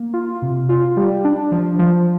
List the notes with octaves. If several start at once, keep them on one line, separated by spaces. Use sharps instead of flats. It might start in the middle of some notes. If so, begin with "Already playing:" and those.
Already playing: A#3
F4
C3
F4
G3
D4
F3
F3